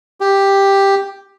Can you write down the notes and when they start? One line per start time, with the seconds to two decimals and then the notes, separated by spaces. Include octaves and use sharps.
0.21 G4